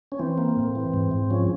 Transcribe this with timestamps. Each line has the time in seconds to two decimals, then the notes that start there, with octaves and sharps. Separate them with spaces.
0.12 C#4
0.19 E3 C4
0.38 A#3
0.57 A2
0.75 E3
0.94 G#2
1.12 G#2
1.30 F3 C#4